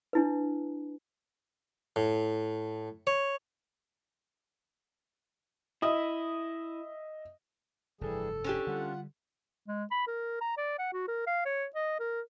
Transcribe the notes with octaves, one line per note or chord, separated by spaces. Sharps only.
D4 E4 B4
A2
C#5
E4 D#5 E5 D#6
F1 G2 E3 G3 G#4 A4
C#4 D4 G4 G#5
D3 G3 F4 F#5
G#3
B5
A#4
A#5
D5
F#5
F#4
A#4
F5
C#5
D#5
A#4